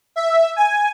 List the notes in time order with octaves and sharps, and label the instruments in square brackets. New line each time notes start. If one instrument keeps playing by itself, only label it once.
[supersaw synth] E5
G#5